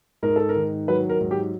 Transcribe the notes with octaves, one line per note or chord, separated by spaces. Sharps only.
G#2 A#4
A4
A#4
D#3
F#3 B4
A#4
G#2
G4